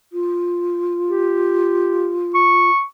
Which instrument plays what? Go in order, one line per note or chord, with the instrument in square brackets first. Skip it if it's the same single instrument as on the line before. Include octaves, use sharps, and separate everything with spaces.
[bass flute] F4
[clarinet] G4
C#6